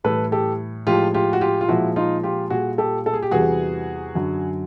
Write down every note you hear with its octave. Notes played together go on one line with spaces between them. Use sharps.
A2 E3 G3 A4 B4
G4 A4
A2 F3 G#3 F4 G4
F4 G4
F#4
F4 G4
F4
A#2 F3 G#3 E4 F#4
D#4 F4
F4 G4
A#2 G3 F#4 G#4
G4 A4
A4
G#4
G4
E2 C3 E3 G3 F#4 G#4
F#2 D3 F#3